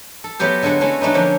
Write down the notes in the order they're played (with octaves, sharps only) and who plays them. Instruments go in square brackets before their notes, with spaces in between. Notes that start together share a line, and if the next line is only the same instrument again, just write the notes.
[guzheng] A4
F#3 A3 B3 G4 C5
D3 G#3 G#4 A4 F#5
G#3 A3 C#4 E4 F#4
F#3 A3 D4 D#4 B4
D3 F3 A#3 C#4